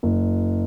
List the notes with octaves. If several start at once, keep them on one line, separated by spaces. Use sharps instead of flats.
F#1